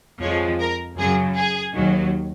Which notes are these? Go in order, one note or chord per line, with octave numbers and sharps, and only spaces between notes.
F2 F3 G#3 C#5
A#4
F#2 C#3 F#3 G#4
G#4
D#2 D#3 F#3